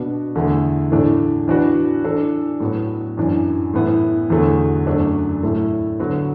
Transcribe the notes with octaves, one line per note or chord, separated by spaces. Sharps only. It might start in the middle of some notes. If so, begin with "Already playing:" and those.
Already playing: B2 B3 D4 F#4
E2 D3 A3 E4
A2 E3 A3 D4
E3 D4 F#4 B4
E3 D4 A4
A2 F#3 B3
F#2 E3 D4
A2 E3 B3 E4
E2 D3 F#3 A3
F#2 F#3 A3 D4
A2 A3 E4
D3 F#3 B3